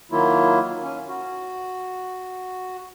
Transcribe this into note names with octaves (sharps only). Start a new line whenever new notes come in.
D#3 F#3 A#3 E4 F4
C#4
F#4